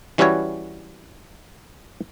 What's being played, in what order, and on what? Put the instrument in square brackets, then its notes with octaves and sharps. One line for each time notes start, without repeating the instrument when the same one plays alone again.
[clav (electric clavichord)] E3 G3 C#4 E4 F#4 C#5